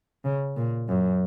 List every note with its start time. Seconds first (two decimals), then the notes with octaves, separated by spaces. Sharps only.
0.24 C#3
0.57 A#2
0.88 F#2